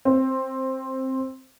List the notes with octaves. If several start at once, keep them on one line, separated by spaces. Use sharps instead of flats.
C4